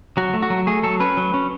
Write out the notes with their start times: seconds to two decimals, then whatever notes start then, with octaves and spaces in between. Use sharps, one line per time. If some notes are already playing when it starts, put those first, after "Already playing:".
0.17 F#3 F#4
0.34 A3
0.43 F#4
0.50 F#3
0.67 A3 G#4
0.83 F#3 A4
1.00 C#4 B4
1.17 F#3
1.34 C#4